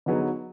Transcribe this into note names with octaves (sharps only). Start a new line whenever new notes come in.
D3 F#3 B3 D#4 G#4